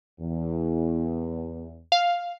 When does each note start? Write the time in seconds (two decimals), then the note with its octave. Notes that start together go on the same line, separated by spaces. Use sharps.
0.21 E2
1.92 F5